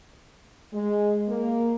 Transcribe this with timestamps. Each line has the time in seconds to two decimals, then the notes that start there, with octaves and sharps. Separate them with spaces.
0.74 G#3
1.28 A#3